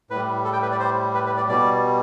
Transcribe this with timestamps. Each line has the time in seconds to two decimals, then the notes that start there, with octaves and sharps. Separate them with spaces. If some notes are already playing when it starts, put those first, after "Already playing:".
0.10 A2 G3 B4
0.44 A4
0.53 G5
0.62 B4
0.72 D5
0.80 C5
1.15 B4
1.26 B4
1.37 D5
1.48 B2 G3 D5